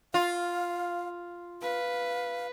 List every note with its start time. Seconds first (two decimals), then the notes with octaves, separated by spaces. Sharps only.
0.14 F4 F5
1.62 B4 F5